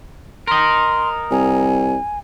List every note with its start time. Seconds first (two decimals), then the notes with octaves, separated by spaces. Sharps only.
0.47 A#4 D#5 C6
1.31 C2 G#5